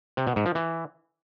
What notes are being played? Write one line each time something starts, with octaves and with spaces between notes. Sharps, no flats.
C3
B2
G#2
F3
E3